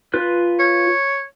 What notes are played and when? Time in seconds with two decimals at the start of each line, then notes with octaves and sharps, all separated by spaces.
0.14 F4 B4 F#6
0.59 C#5